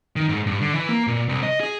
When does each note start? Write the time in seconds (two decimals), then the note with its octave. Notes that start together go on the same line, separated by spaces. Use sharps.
0.16 D#3
0.29 G#2
0.47 G2
0.61 D3
0.75 E3
0.89 A#3
1.07 A#2
1.29 C2
1.43 D#5
1.60 G#4